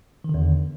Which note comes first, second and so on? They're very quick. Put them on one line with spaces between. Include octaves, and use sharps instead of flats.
D#3 D3 E2